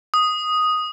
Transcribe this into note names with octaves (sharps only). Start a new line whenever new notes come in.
D#6